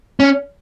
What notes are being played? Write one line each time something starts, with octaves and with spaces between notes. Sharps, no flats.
C#4